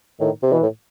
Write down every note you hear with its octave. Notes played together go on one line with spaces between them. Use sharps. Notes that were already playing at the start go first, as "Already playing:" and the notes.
A2 D#3
C3
B2 E3
A2